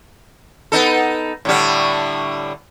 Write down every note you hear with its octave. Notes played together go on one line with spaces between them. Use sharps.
B3 D#4 A4
A2 D3 G3